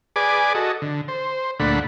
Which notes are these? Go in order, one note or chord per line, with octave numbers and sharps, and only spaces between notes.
G#4 B4 D5 G#5 D6
F#4 A4 D#5
D3
C5
D2 A#2 A3 D4 F#5 B5